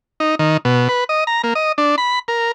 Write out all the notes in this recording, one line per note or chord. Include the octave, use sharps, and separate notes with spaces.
D#4
D#3
B2
B4
D#5
A#5
A#3
D#5
D4
B5
A#4